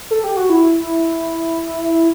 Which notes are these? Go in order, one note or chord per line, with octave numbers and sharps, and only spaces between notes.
A4
G4
F#4
E4